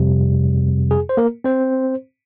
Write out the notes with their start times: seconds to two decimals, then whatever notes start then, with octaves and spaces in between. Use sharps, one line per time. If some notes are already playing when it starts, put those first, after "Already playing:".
Already playing: F2 C3 G3
0.91 G#4
1.09 C5
1.17 A#3 A#4
1.44 C4 C5